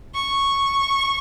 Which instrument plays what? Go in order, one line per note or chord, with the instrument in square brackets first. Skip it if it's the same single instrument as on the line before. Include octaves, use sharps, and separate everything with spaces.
[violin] C#6